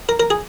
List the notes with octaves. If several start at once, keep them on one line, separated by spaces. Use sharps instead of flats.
A#4
A#4
G#4